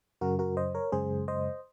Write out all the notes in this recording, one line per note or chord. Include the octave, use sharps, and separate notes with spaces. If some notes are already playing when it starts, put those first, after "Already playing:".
F#2 C#3 F#3 F#4 A#4
F#4 A#4
C5 D#5
A#4 C#5
F#2 C#3 G#3 G#4 C5
C5 D#5